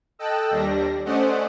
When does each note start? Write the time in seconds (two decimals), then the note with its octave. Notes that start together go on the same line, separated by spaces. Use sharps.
0.19 A4 D#5 G5 A5 E6 F#6
0.51 D#2 G3 D4 A#6
1.05 A3 C#4 C5 D5 D#5 F#5